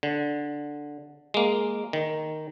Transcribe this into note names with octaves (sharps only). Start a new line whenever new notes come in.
D3
G#3 A#3
D#3